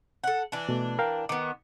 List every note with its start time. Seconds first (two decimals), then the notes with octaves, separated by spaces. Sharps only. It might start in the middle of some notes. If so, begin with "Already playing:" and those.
0.24 A4 F#5
0.52 E3 D4
0.69 B2 A3
0.99 A#4 F5 G5
1.29 D#3 B3 D6